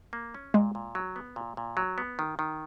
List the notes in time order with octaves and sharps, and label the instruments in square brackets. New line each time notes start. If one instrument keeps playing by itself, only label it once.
[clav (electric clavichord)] A#3
C#4
[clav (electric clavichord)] A#2 [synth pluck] G#3
[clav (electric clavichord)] A#2
F#3
B3
A#2
A#2
F#3
B3
D#3
D#3